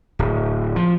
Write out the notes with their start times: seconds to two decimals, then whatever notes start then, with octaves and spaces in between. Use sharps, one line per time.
0.19 D1
0.76 F3